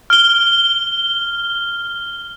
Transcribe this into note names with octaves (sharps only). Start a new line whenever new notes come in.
F6 G7